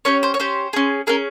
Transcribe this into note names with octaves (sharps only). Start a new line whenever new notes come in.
C#4 G4 C#5
C5
C#5
C#4 G4 C5
C#4 G#4
C#4 G#4 A#4